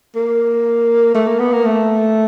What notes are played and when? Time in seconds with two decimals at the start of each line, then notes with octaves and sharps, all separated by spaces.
0.16 A#3
1.15 A3
1.27 A#3
1.39 B3
1.53 A#3
1.65 A3